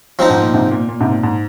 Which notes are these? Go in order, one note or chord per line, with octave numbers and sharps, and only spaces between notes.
F3 C4 D#4
G#2
A#2
G#2 C3
A#2
A#2
G#2 C3
A#2
G#2